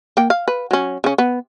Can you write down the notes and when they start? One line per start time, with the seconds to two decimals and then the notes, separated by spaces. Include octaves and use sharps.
0.17 A#3 G5
0.30 F5
0.48 B4
0.71 F#3 C#4
1.04 C#3 C#4
1.18 B3